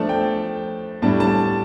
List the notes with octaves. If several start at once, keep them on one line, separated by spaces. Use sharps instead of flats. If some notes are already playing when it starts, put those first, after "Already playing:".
Already playing: F3 A3 D4 A5
G5
A2 G3 D4 A5
A5